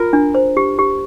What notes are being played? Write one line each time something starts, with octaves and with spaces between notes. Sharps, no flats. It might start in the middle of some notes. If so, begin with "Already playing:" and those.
Already playing: F4 A#4
D4
C5
G4
G4